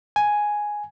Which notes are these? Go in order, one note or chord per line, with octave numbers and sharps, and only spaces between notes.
G#5